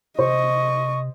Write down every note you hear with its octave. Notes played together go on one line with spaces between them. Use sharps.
C3 C5 D#5 C#6